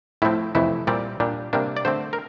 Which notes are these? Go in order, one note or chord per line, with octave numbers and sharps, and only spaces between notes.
A2 F3 A3 C4 E4
F2 C3 E3 A3 E4
A#2 G3 C4 D5
A#2 G3 D4
C3 G3 A#3 D4
D5
D3 A3 C4 C5
A#4